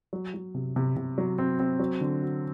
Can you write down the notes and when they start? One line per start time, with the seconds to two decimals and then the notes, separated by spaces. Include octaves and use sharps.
0.13 F#3
0.34 F#3
0.54 C3
0.76 C3
0.96 C3
1.18 F#3
1.38 C4
1.59 C4
1.79 F#3
2.01 D3
2.21 F#4